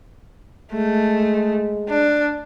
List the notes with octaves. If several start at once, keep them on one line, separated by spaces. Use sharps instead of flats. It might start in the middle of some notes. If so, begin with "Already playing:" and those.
G#3 A3
D4